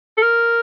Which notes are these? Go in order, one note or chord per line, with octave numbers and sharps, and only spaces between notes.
A4
A#4